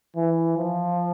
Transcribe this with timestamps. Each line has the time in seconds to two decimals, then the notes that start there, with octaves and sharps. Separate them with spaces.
0.16 E3
0.57 F3